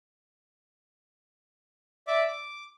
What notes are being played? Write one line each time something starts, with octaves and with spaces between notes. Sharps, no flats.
D5 E5 D6
D6